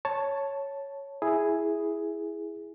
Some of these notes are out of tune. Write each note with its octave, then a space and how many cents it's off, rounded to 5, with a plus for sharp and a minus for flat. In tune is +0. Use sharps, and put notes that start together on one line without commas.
C#5 +0 A5 +0
E4 +0 G#4 +0